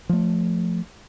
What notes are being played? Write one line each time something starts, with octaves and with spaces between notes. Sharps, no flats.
F3 A3